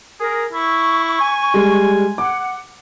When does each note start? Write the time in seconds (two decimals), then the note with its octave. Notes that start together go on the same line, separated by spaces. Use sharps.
0.20 G#4 A#4
0.53 E4 C#6
1.21 G#5
1.54 G3 G#3
2.18 F#5 D6